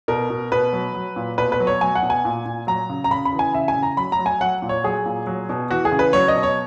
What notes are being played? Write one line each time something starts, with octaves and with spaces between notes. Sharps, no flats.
B2 A#4
B2
B2 B4
F#3
F#3
A#2
B2 B4
B4
F#3
C#5
F#3 G#5
F#5
B2
G#5
A#2
A#2
F#3 A#5
C#3
A#5
C#3 B5
B5
E3
G#5
C#3 E5
G#5
C#3
A#5
F#3 B5
A#5
F#3
G#5
F#3 F#5
A#2
C#5
F#3 G#4
A#2
F#3
B2
E3 F#4
G#4
C#3
B4
F#3 C#5
D#5
B2
C#5